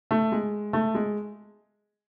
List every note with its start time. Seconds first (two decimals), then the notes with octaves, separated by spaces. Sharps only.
0.11 A3
0.32 G#3
0.73 A3
0.95 G#3